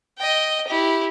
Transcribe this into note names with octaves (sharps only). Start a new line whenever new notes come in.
D#5 G5
E4 G4